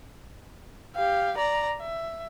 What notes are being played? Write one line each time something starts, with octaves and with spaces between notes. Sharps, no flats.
G4 F5
D5 A#5
E5